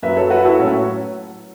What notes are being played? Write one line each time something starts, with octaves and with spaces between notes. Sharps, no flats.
F#2 F#3 B4 E5
A4 C#5
F#4 B4
E4 A4
A2 F#3 C#4 F#4